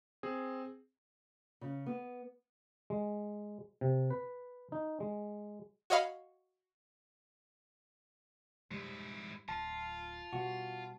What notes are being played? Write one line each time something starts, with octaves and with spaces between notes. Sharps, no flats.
C4 G#4
C#3
B3
G#3
C3
B4
D#4
G#3
F#4 C#5 D#5 F5 B5
G#2 G3 E4
D1 F4 A5
B2 G3 F#4